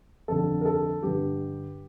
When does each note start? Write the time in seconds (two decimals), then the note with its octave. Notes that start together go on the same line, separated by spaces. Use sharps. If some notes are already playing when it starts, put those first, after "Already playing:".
0.28 F2 D3 A4
0.61 A#4
0.65 A4
1.03 G2 D3 G4